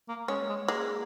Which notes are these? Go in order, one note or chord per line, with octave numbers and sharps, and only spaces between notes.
A#3
G#3 C#4
G#3
G#3 A#3